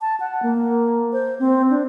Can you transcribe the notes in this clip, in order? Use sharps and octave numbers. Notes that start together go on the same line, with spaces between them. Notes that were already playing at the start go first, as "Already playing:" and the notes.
A5
F#5
A#3
C5
C4
D4